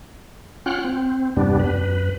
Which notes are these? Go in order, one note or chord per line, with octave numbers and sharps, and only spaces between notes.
C#4 F4 F#5 G5 F6 F#6
C4
E2 G2 C3 G3 B3 D4
F#2 B4